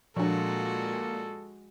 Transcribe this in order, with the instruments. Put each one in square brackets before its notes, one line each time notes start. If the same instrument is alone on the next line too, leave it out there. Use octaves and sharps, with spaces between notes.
[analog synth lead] A#2 [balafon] F3 D4 [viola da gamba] G#3 F#4 [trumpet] A4